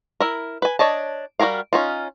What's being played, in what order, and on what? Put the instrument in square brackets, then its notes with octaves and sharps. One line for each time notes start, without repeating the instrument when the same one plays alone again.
[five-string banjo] E4 A#4
B4 G#5
D4 C#5 D#5 A5
G3 F#4 G#4 A#4 F5
C#4 D#4 F4